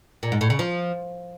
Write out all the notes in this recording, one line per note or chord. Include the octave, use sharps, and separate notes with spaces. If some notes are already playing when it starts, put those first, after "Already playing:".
A#2
G#2
A2
C#3
F3